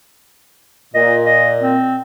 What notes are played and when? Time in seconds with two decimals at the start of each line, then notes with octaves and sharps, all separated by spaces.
0.95 A#2 D#5
1.25 D#5
1.62 C4